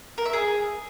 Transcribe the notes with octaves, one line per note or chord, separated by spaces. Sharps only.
A#4
E5
G#4